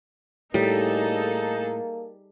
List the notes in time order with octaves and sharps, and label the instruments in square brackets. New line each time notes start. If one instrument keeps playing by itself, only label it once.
[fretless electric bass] A2 [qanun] G3 [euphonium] A#3 [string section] D#4 G#4 A4